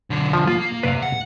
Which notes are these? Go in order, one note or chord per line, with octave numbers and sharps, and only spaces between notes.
B1 D3
F3
A#3 F4
C3 B4 D5 F5
F#5